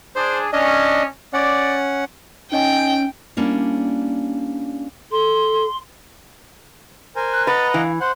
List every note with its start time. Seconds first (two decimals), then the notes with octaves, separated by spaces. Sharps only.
0.16 D4 G#4 C5
0.53 C#4 D4 D#5
1.33 C#4 D5 F#5
2.52 C#4 D#4 D#5 G5 G#5
3.37 G3 A#3 C#4 D4 E4
5.12 A4 C6
7.16 A#4 C5 G#5
7.33 F#6
7.47 B4 D#5 F#5 A#5 A6
7.74 E3 F5
8.01 C5 F#5 C6